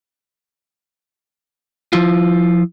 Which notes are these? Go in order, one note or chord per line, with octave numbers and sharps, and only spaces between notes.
F3 E4 F4